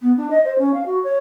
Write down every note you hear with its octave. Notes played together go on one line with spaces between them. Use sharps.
B3
D4
D#5
C5
C#4
F5
F#4
C#5